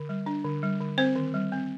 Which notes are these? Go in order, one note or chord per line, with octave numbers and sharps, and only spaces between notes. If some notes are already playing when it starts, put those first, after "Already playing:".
Already playing: D3
G3
D4
D3
G3
D3
C4 C5
D#3
G3
C4